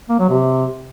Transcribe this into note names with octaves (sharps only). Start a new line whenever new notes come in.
A#3
F#3
C3